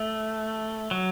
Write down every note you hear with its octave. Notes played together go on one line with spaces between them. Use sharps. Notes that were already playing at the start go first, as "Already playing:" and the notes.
Already playing: A3
F#3